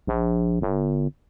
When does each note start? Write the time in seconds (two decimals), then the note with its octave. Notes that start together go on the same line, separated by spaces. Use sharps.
0.07 A#1
0.61 G1